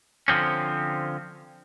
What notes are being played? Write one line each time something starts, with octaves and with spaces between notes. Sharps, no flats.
D3 F3 C4 C#4